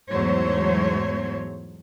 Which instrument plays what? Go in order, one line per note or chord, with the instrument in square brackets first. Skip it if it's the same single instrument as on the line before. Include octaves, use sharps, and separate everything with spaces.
[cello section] E2 G#2 F#3 A3 C5 C#5